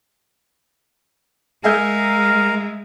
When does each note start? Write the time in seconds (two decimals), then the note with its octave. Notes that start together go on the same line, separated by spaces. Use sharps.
1.64 G#3 G#4 A#4 E5 F5 A#5 G6